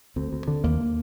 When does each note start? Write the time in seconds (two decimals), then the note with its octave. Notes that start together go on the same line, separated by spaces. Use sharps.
0.16 D2 C4
0.33 D2
0.48 D3
0.64 D#2 A#3